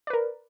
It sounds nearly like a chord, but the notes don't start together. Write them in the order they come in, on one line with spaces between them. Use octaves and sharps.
D5 B4 A#4